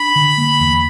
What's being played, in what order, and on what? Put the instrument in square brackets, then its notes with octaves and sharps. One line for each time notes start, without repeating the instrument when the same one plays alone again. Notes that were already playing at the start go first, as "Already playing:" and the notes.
Already playing: [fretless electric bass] D4 [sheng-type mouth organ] B5
[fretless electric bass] D3
A#3
E2